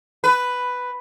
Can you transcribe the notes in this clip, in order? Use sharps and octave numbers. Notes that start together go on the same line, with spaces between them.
B4